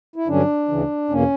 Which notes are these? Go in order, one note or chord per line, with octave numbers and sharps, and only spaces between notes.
E4
G2 D3 F#3 C#4 D4
D2 C#3 E3
E2 B2 A#3 C#4